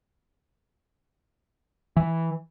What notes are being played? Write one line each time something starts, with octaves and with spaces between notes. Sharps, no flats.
E3